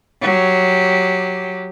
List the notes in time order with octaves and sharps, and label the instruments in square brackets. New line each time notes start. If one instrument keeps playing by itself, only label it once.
[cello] F#3 G4